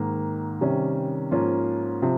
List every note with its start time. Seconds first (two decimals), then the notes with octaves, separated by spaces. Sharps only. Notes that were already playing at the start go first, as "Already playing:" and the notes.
Already playing: G#2 D#3 A#3
0.61 C3 D#3 G3 C#4
1.31 G#2 F3 A#3 C#4 F4
2.02 C3 F3